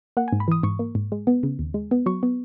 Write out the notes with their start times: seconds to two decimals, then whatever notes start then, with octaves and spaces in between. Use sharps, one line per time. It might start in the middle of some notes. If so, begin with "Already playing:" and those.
0.17 A#3 F#5
0.28 G#2 G#5
0.40 B5
0.48 E3 D#6
0.63 G#2 C#6
0.79 A#3
0.95 G#2
1.12 G#3
1.27 B3
1.43 C#3
1.59 D#2
1.74 G#3
1.91 B3
2.06 F#3 C#6
2.23 B3